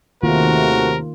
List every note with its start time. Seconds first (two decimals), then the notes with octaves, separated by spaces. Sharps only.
0.23 D#2 C3 D#3 A3 A#3 F4 F#4 A#4